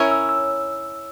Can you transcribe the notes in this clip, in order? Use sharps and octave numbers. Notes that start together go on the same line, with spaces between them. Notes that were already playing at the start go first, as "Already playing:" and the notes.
Already playing: C#4 E4 A#4 C#5 E6
E6
E6